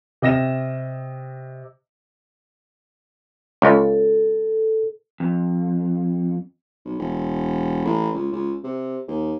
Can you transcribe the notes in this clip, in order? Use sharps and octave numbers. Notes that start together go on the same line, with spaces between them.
C3 D#5 A#6 E7
C#2 A4
F2
B1
E1
A1
C#2
C#2
C3
D#2